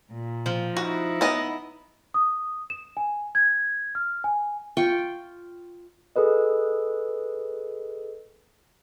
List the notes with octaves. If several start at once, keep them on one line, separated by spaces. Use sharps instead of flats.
A#2
F3
D#4 E4 F#4
B3 D#5
D#6
E7
G#5
G#6
F6
G#5
F4 G5 C#6
G#4 A4 B4 D#5